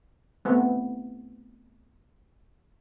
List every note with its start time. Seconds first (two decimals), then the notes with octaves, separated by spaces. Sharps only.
0.45 A3 B3 C4